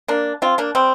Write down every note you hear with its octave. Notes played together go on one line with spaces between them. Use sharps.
A#3 D4
C4 F4
A#3 D4
G3 C4